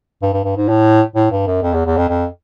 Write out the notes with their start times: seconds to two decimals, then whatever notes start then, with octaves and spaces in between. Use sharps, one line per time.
0.22 G2
0.33 G2
0.45 G2
0.57 G#2
0.68 A2
1.15 A2
1.31 G2
1.47 F#2
1.62 F2
1.73 E2
1.86 E2
1.97 F2
2.09 F2